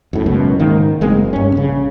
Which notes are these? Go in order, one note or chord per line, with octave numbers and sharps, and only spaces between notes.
F#2 A2
C#2 F#2 B2
G#2 D#3 A#3
F#1 G#3 A#3 C4
G2 C#4
A#1 C#3